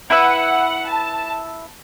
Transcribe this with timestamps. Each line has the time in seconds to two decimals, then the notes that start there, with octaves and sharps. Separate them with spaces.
0.10 E4 B4 E5 F#5
0.88 A5